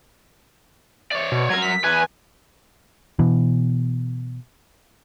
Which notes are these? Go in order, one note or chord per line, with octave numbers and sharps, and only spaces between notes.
C#5 D5
B2
F#3 A#4 G#6
B6
E2 B4 G#5
B2 E3